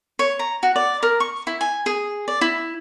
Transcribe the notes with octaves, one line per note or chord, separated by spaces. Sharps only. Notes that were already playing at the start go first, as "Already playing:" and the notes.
C#5
A#5
F#4
D5
A#4
C#6
E4
G#5
G#4
D5
E4